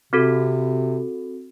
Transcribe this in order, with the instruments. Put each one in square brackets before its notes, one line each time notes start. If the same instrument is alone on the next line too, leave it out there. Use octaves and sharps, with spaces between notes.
[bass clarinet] C3 [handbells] C4 F#4 A4